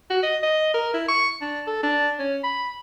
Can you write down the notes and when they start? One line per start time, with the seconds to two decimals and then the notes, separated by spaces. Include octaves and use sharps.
0.10 F#4
0.23 D#5
0.43 D#5
0.74 A#4
0.94 E4
1.08 C#6
1.41 D4
1.67 A4
1.83 D4
2.19 C#4
2.44 B5